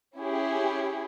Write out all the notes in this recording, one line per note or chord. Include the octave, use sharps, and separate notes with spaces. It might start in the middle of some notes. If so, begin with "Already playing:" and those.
C#4 E4 G4 G#4